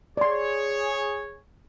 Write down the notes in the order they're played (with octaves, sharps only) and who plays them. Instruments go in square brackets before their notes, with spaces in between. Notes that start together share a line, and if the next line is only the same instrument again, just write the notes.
[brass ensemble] G#4 C#5 [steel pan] D5 C6